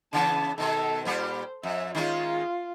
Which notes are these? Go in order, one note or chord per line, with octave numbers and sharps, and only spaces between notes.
C#3 E3 B3 A5
B2 D#3 A4
A#2 G3 G4 C5
F2 E5
D#3 G#3 C#4 F4